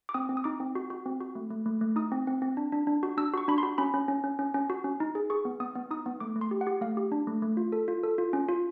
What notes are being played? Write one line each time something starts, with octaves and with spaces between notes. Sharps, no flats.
D6
C4 D#6
C4
D#6
D#4 D6
C4
F#4
F#4
C4
F#4
A3
A3
A3
A3
D#4 D#6
C4
C4
C4
D4
D4
D4
F#4
D4 E6
F#4 C#6
D4 B5
C6
F#4
C#4 B5
C#4
C#4
C#4
C#4
C#4
F#4
C#4
D#4
G#4
G#4 C#6
B3
B3 D#6
B3
D#4 D#6
B3
A3 D6
A3
C6
G4
F#5
G4
A3 F5
G4
D4
A3
A3
F4
A4
F4
A4
F4
C#4
F4